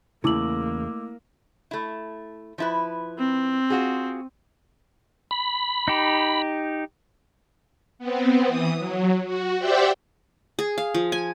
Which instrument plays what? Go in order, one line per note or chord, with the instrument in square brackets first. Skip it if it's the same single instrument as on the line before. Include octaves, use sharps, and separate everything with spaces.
[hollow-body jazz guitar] E2 C#3 [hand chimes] A3 D6 E6 [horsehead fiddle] A#3 [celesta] E4 F#7
[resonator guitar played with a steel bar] A3 E4
F3 E4 B4
[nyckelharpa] C4
[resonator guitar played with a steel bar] F4 F#4 G#4
[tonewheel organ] B5
[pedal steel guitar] D#4 G4
[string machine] B3 C4
E3 D#6
F#3
F#4
G4 C5 D5 E5 F#5 G5
[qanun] G#4
F5
F3
G#5